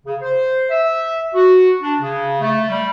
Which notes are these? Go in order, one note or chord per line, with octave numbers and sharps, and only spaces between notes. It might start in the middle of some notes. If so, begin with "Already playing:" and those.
C#3
C5
E5
F#4
D4
C#3
A3
G3